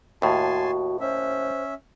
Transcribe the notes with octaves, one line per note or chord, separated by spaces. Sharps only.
D#2 A2 F#4 G#5 A5 C6
C#4 C5 E5